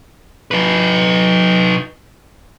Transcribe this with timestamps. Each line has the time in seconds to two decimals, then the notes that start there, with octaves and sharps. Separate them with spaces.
0.51 D#4 B4